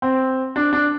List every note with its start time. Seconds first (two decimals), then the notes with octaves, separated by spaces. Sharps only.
0.02 C4
0.56 D4
0.73 D4